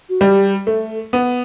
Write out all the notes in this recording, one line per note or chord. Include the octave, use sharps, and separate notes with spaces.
F#4
G3 G4
A3 A4
B3